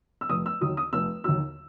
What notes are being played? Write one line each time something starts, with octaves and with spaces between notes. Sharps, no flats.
E6
F1 D#6
E6
D#2 D#3 F#3 D#6
D#6
F1 E6
D#2 D#3 F#3 E6